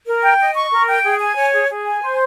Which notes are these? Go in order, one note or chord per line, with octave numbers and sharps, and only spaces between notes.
A#4
G5
D#5
C#6
A#4
G5
G#4
G#5
C#5
G#4
G#4
G#5
C5